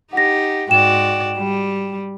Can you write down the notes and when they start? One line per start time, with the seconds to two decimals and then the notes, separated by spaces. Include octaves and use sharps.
0.13 D#4 G4 F#5 A#6
0.69 G#2 F#4 D5 G5 E7
1.38 G3